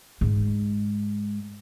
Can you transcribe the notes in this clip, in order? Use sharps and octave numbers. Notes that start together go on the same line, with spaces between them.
G#2 G#3